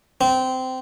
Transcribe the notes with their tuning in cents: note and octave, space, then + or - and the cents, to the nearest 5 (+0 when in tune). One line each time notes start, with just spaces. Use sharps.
C4 -20